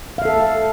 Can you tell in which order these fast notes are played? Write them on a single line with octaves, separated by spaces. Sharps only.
F5 E5 A4